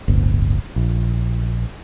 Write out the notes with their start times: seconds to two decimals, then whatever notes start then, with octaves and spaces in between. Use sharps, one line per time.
0.08 D1 G1
0.76 A#1